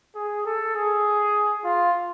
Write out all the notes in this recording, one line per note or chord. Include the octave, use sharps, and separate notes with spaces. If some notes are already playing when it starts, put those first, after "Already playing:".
G#4
A4
G#4
F4